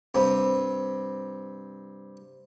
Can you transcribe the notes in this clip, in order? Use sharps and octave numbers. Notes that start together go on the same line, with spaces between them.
G2 C3